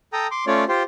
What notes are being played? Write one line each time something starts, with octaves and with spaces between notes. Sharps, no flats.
A4 G5 A#5 D#6
C6 D6
A3 C#4 F4 C#5 D5
F4 G4 C5